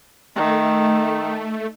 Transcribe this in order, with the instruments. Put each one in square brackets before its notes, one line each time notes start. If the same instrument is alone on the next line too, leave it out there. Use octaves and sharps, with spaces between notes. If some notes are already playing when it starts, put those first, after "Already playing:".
[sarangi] D#3 [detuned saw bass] A3